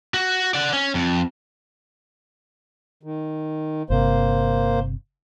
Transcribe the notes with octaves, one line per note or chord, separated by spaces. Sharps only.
F#4
D5 F#5
C#4
F2
D#3
G1 C3 A#3 C5